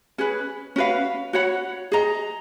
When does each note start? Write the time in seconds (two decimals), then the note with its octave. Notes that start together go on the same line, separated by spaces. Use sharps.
0.18 C#4 G#4 B4
0.76 C#4 F#4 B4 F5
1.33 F#4 C#5 F#5 B5
1.92 G#4 D#5 A#5